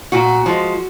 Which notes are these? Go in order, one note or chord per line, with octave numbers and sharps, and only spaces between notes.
A#2 F#4
F3 G#3